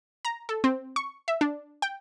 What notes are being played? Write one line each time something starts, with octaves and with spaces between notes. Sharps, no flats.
A#5
A4
C4
C#6
E5
D4
G5